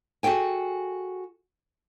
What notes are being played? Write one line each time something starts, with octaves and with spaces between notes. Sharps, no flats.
F#4 G#4 A4 G5 G#5